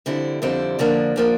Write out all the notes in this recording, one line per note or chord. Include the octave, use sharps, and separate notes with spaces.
F2 D3 G3 C4 E4
F2 D3 G3 C4 E4
F2 D3 F3 A#3 D4
D3 F3 A#3 D4